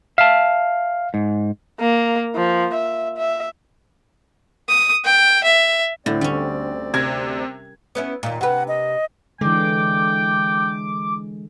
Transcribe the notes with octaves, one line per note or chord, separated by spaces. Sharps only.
E5 F5 A5
G#2
A#3
F3
E5
E5
D#6
G5
E5
D2 A2 D3 C4 D5
D3 G3 C#4
C3 A#4 G#6
B3 C#4 E4
D#2 A#2
C3 B4 F#5
D#5
D3 E3 G#3 G5 D6